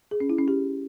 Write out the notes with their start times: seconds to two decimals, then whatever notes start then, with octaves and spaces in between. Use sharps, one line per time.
0.11 G#4
0.20 C#4
0.30 E4
0.39 C#4
0.48 G4